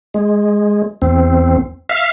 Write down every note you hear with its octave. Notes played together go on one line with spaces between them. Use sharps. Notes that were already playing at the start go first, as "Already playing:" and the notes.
G#3
E2 C4
E5 F5 F6